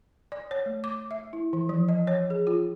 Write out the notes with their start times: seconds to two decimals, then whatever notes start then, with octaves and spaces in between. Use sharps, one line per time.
0.32 D5
0.51 C#5
0.66 A3
0.84 D6
1.11 E5
1.33 E4
1.53 E3
1.69 F3
1.88 D#5
2.07 C#5
2.30 G#4
2.47 F4